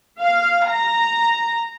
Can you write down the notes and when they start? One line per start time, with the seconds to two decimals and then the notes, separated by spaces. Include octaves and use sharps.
0.20 F5
0.71 A#5